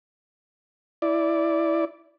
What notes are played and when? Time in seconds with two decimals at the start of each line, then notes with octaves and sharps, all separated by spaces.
1.02 E4 D5